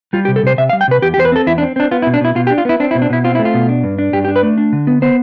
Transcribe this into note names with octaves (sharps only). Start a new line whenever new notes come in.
G3 F4
G4
C3
A4
C3 C5
C3 E5
F5
G3
G5
C3 B4
E2 G4
G4
E2 C5
B4
C4 A4
E2 E4
D4
C4
C4 D4
B3 F4
E4
B2
D4
B2 E4
B2 F4
G4
D4
F4
B3 E4
C4 D4
E4
B2
D4
B2 E4
C4 F4
A3 E4
F4
B2
D4
G2
D4
G2 G4
G4
D4
B4
A3
D4
D3
B3
B3 C5